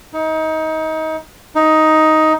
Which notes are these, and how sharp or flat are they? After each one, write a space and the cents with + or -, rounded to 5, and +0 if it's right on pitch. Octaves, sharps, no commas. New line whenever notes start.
D#4 +25
D#4 +10